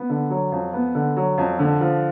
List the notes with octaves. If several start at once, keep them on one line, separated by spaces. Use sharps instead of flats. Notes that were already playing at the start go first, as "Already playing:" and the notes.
Already playing: B3
D3
F#3
F2
B3
D3
F#3
F2
D3
F3